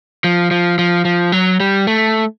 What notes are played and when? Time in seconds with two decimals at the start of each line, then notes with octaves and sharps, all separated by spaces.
0.24 F3
0.51 F3
0.79 F3
1.05 F3
1.32 F#3
1.60 G3
1.87 A3